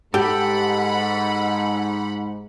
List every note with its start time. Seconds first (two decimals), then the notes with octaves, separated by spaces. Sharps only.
0.14 G#2 G4 A4 F#5 G5 B5